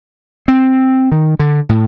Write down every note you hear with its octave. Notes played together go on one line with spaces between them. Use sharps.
C4
D#3
D3
A2